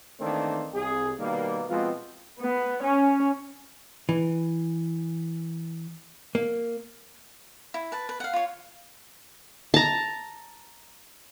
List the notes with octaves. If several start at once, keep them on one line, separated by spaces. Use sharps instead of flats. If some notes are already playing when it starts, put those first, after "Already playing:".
D#3 E3 A3 A#3 C4 D4
C2 G#4
B2 D#3 G3 A#3
B2 F3 G#3 C4 F4
B3
C#4
E3
A#3
E4
B4 A5
B4
F5 F#5
F4 C#5
A5 A#5